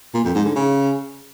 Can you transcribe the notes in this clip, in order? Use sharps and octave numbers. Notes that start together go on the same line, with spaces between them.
A#2
F2
G#2
D3
C#3